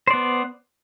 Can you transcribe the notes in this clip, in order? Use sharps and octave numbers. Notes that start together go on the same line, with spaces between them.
B3 C5 D5